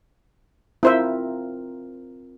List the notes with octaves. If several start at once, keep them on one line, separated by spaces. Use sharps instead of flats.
C4 E4 F4 A#4 C5 E5